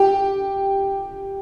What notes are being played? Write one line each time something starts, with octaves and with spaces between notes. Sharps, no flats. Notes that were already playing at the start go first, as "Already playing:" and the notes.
Already playing: G4